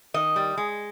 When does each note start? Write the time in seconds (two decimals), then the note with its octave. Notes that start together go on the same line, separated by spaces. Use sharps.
0.14 D#3 D#5
0.36 G3
0.57 G#3